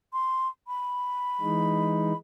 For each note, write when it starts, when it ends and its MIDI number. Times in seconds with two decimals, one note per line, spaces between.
0.13 0.48 84
0.68 2.17 83
1.41 2.13 52
1.41 2.13 56
1.41 2.13 63